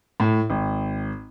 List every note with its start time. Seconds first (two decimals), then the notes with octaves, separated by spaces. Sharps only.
0.20 A2
0.50 G#1